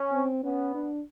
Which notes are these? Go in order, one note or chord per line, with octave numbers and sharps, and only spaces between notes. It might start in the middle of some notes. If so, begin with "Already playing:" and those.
Already playing: C#4
C4
B3 C#4
D4